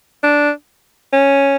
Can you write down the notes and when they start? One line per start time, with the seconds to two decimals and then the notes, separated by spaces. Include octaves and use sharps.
0.23 D4
1.13 C#4